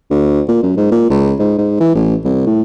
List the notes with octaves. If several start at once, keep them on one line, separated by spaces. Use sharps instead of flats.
D2
A#2
F#2
G#2
A#2
C#2
G#2
G#2
E3
A1
C2
A2